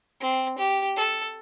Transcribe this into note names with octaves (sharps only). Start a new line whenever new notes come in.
C4
G4
A4